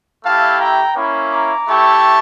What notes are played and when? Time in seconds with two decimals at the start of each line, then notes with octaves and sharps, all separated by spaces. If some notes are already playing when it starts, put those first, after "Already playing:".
0.24 A3 E4 G4 F5 A5
0.60 G5 A#5
0.96 A#3 C#4 E4
1.32 A#5 D6
1.68 A3 E4 G4 A5 C#6